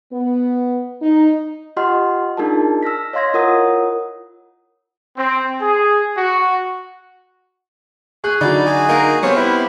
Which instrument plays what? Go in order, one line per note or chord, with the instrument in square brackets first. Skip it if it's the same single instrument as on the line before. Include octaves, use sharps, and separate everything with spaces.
[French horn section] B3
D#4
[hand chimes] F4 G4 D#5 F#5 C6 F6
D4 D#4 F4 G#4 A#4 A5
E6 F6 A#6 B6
C#5 D#5 F5 C6 G#6 A#6
E4 F4 A#4 C#5 F#5 D#6
[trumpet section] C4
G#4
F#4
[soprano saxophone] G#4 [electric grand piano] C#6 [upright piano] F#6
[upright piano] D3 F#3 [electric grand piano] D#4 [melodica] E4 [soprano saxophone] D5
[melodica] F#4 G#4 G#5
[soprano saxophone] A#3 [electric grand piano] D#4 A#4
[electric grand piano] G3 B3 C4 [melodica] C5 F5 D6 [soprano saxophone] C#5
[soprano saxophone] E4 [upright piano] B4